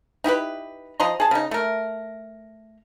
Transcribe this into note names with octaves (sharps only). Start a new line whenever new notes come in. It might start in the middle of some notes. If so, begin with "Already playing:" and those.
D#4 E4 G4 B4
F3 D#5 A#5 C6
G#4 A5
C#3 D#4
A3 A#4